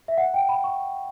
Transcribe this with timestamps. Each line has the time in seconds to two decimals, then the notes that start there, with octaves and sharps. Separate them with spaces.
0.08 E5
0.18 F#5
0.34 G5
0.49 B5
0.64 C#6